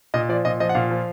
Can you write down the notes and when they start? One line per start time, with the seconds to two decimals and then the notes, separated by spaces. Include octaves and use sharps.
0.14 A#2 D#5
0.29 F3 D5
0.45 A#2 D#5
0.60 F3 D#5
0.69 F#5
0.75 A#2 F5
0.91 F3